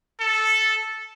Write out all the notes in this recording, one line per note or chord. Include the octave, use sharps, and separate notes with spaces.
A4